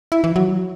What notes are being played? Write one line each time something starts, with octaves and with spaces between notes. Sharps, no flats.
E4
E3
F#3